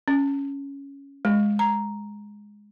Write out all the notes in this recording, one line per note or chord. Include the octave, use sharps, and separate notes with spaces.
C#4
G#3
A#5